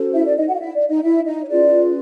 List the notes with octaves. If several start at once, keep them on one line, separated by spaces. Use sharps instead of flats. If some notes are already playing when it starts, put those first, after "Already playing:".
Already playing: C#4 F#4 A4 C5
E4 E5
D5
D#4 D#5
F#4 F#5
F5
E4 E5
D5
D#4 D#5
E4 E5
D#4 D#5
C#5
C#4 F4 G#4 B4 D5